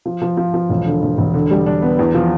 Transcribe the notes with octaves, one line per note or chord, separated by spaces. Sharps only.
F3
F3
F3
F3
E1
D3
E1
E1
D3
G3
D4
B3
E2
F3